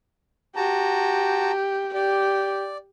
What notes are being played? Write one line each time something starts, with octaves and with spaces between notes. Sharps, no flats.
F#4 G4 A5 A#5
G4 D5